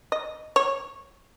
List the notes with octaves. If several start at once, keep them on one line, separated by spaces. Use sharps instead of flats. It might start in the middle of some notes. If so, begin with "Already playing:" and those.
D#5
C#5